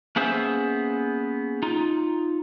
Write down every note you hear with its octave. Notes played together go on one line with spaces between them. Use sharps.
A#3 B3 C#4 G#4 C5 E5
D#4 F4